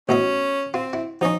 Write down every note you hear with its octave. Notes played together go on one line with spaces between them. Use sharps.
A1 B2 C#4 E5
C4 F4
E4
F3 C#4 D#4